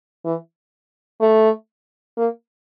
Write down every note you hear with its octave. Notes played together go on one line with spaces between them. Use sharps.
E3
A3
A#3